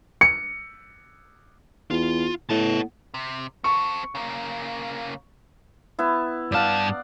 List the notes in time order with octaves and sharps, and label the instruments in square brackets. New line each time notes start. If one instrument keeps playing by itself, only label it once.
[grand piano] C#7
[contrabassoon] E2 [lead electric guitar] F4
[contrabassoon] A2 [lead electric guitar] B3 A5
[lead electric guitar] C3
[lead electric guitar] C4 A4 [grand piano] C#6
[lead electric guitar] C#3 A#3
[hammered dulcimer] B3 E4
[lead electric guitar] G2 A5 [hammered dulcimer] D5 F5 F#5